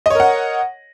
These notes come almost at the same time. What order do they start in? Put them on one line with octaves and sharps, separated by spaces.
D#5 C#5 A#4 F#5